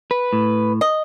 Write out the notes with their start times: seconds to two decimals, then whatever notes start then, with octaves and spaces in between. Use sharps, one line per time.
0.11 B4
0.33 A2
0.81 D#5